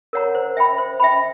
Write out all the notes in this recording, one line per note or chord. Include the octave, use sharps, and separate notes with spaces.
A#4 C#5 F#5 A#5
C5
E5 G5 B5
C5
E5 G5 B5